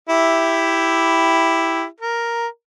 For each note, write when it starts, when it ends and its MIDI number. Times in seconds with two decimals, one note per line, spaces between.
0.09 1.85 64
0.09 1.85 67
0.09 1.85 76
2.00 2.47 70